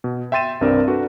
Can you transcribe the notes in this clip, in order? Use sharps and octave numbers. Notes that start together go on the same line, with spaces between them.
B2
E5 G5 C6 A6 D#7 E7
C2 G2 C4 D4 A#4 D5
D4 F#4 A4 B4